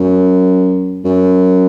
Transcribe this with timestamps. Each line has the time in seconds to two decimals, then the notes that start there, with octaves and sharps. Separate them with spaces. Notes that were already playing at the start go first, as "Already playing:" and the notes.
Already playing: F#2
1.05 F#2